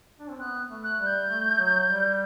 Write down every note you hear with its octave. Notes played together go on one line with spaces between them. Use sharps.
D4
C4
B3 F#6
A3
F#6
G3
G6
A3
F#3
G3